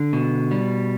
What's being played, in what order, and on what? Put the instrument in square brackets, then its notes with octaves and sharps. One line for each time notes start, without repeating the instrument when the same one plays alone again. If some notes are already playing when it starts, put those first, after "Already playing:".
Already playing: [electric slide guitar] D3
B2
G3